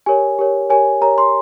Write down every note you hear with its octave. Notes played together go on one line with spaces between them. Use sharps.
G4 A#4 C#5 G#5
G4 A#4 C#5
G4 A#4 C#5 G#5
G4 A#4 C#5 A#5
C6